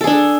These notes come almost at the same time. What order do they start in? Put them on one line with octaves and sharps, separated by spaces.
A4 G#4 D4